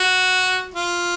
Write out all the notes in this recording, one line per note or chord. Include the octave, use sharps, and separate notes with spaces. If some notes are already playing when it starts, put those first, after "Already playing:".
Already playing: F#4
F4